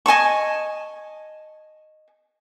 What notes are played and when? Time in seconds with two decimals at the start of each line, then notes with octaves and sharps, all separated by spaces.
0.06 D#5 G#5 A5 C#6